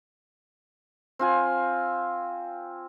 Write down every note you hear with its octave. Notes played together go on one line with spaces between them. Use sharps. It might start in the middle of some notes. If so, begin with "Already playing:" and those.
C4 F4 G#5